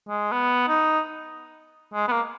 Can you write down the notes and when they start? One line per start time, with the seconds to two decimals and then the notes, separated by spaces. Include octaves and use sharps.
0.09 G#3
0.32 B3
0.68 D#4
1.94 G#3
2.08 B3
2.12 A#3